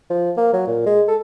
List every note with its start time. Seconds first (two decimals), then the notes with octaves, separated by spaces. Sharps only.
0.10 F3
0.37 A#3
0.53 F#3
0.67 A#2
0.86 G#3
1.08 A4